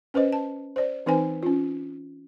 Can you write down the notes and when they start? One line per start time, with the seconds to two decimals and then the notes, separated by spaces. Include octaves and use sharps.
0.14 C#4 B4 C5 D#5
0.33 A5
0.76 C5 D5
1.06 E3 C4 D#4 B4 C5 G#5
1.43 C#4 F4